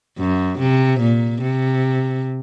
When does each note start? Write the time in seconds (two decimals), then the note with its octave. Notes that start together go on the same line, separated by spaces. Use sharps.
0.18 F#2
0.59 C3
1.01 A#2
1.41 C3